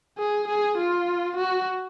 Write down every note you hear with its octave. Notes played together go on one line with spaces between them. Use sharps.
G#4
G#4
F4
F#4